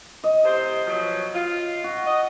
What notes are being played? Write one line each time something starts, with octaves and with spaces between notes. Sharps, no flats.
D#5
A2 C3 C5
B2 F3 F#3
F4
F#4
D#5